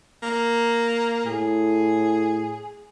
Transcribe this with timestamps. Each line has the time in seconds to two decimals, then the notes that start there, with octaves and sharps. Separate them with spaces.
0.23 A#3
1.26 A2 G#4